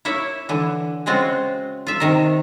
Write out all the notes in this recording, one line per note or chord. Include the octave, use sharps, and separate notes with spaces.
A#3 E4 C#5 E5
D3 E3
C#3 G#3 C4 F4 F#4
F4 E5
C3 D#3 A#4